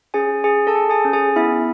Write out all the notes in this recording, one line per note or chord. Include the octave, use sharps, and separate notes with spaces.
C#4 G#4 G#5
G#4 G#5
A4 A5
G#4
G#4 G#5
C#4
G#4 G#5
B3 E4 E5